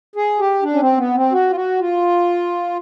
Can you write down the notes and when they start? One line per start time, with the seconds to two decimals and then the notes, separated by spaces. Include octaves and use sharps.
0.16 G#4
0.39 G4
0.62 D4
0.73 C#4
0.80 C4
0.97 B3
1.15 C4
1.32 F#4
1.51 F4
1.55 F#4
1.80 F4